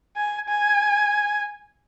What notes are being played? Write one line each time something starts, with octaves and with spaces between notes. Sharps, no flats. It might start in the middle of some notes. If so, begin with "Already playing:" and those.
G#5
G#5